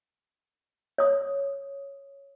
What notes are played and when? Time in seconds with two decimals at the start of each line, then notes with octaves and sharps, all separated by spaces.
0.98 C#5 D#6